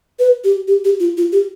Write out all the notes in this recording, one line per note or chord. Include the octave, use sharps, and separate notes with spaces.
B4
G4
G4
G4
F4
F4
G4